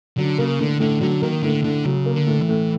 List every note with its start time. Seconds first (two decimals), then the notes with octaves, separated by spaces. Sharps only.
0.18 D3 F#3
0.38 C#3 A#3
0.59 A2 D3
0.80 A2 D3
1.01 D3 F#3
1.22 D#3 A#3
1.43 A2 D3
1.64 A2 D3
1.85 C#3 F#3
2.06 A#3
2.13 D3
2.27 A2
2.42 E3
2.49 A2